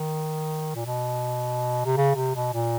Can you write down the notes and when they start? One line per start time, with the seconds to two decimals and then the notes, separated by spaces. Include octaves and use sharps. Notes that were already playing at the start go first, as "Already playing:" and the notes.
Already playing: D#3
0.75 A#2
0.85 B2
1.86 C3
1.97 C#3
2.16 C3
2.35 B2
2.53 A#2